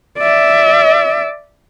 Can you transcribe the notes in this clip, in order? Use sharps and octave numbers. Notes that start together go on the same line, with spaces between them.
D5 E5